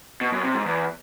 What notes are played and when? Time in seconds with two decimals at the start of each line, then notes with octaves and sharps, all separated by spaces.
0.21 B2
0.32 F#2
0.43 C3
0.54 G#2
0.66 E2